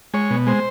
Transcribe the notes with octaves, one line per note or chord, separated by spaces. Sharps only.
G#3 C#5
B2
G#3 C5